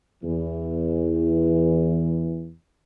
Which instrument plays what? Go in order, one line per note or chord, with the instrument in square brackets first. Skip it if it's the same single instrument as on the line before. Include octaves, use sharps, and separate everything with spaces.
[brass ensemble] E2 E3